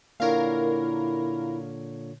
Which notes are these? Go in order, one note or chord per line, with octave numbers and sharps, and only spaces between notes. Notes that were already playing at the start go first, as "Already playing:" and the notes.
A#2 D3 E4 A#4 C#5 F5